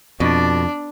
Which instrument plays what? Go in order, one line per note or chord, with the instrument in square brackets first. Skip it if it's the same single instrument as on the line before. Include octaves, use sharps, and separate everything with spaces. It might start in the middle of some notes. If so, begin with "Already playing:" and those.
[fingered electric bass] F2 [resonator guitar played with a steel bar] B2 [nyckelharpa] D4 D5